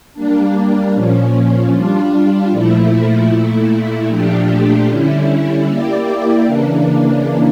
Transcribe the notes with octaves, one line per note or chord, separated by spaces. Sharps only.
G3 A#3 D4
A#2 F3 C#4
G3 D4 F4
A#2 F3 A3 E4
A#2 A3 E4
A#2 F3 A3 D4 G4
D3 G3 C#4 E4
A#3 E4 G4 D5
C#3 E3 A#3 D4